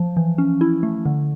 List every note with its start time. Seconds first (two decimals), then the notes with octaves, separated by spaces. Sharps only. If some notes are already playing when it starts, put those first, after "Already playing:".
Already playing: F3
0.17 E3
0.38 C#4
0.61 E4
0.83 A3
1.05 D3